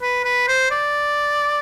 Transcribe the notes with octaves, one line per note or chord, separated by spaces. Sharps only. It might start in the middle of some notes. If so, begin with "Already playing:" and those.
B4
B4
C5
D5